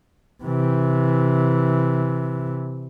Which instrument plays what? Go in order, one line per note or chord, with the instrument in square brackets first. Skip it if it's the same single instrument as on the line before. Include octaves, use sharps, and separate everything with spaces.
[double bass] C3 E3